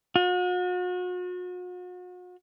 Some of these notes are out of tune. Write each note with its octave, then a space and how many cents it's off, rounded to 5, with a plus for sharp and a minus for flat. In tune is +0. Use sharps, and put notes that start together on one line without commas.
F#4 -40